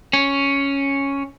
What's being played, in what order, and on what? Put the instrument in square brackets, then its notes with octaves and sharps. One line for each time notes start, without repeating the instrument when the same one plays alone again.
[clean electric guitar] C#4